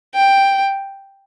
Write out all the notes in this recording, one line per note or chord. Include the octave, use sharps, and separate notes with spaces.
G5